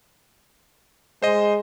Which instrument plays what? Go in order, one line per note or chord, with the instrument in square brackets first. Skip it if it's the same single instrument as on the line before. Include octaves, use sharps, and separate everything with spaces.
[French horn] G#3 [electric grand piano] C5 D#5